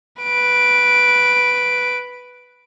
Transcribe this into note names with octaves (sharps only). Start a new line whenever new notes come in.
B4 D7